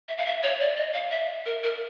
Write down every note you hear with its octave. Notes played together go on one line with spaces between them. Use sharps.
E5
F5
E5
C#5
D5
D#5
F5
E5
A#4
A#4